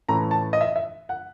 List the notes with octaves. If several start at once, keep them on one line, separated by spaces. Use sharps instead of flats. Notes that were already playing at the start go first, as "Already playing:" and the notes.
A2 E3 A3 C#4 A#5
A5
D#5
E5
D#5
E5
F#5